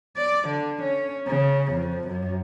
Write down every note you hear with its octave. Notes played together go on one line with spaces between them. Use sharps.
D5
D3
C#4
C#3
F2
F#2